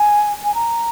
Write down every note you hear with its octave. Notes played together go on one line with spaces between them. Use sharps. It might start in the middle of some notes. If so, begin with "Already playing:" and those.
Already playing: G#5
G#5
A#5